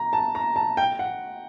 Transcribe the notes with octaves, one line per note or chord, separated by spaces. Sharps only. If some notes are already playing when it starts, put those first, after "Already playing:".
Already playing: A#5
A5
A#5
A5
G5
F#5